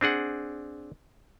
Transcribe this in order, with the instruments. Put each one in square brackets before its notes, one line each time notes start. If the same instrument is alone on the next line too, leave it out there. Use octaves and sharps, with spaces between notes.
[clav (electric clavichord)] C4 D4 G#4 F#5